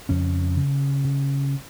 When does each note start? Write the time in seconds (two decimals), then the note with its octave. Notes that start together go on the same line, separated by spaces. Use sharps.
0.09 F2 C#3 C#4
0.57 C#3
1.04 C#3